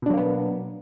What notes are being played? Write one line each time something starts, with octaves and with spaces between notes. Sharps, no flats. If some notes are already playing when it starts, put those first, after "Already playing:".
B2 F#3 A#3 B3 D4